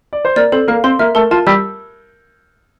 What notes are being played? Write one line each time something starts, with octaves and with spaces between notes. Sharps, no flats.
D5
C5
A#3 A#4 D5
C4 A4 C5
A#3 A#4 F5
C4 C5 C6
A#3 A#4 E5
A3 A4 A#4
F4 A5
G3 G4 E6